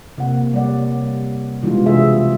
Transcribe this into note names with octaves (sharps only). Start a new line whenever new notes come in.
C3 A#3 F#5
G3 C#5 D5 F#5
B2 E3 G3 G#3 D4 F4
C3 G#4 E5